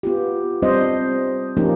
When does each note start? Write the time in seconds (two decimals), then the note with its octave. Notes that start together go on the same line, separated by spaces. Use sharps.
0.03 B3 F4 G4
0.62 G3 C4 D4 C5 D#5
1.57 F3 A#3 C#4 D#4 G4